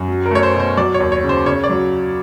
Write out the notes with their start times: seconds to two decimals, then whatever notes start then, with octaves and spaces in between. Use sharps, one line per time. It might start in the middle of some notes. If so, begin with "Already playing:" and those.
Already playing: F#2
0.08 F#3
0.26 A#4
0.31 A3 C#5
0.43 C5
0.55 B2
0.60 C5
0.77 F#3 D5
0.94 C#5
1.00 D#2
1.12 C#5
1.24 C#3
1.29 C5
1.46 C#3 C#5
1.64 D5
1.70 F#3